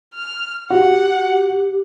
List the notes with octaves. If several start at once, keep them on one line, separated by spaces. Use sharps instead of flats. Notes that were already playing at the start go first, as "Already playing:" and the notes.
F6
F#4 G4 F#5